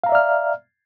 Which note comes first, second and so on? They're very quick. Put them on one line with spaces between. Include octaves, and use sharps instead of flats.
F5 A#5 E5 D5 F6